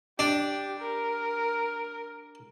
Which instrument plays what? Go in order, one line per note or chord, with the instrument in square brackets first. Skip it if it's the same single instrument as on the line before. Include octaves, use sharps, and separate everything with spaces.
[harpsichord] D4 [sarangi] G4
[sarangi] A#4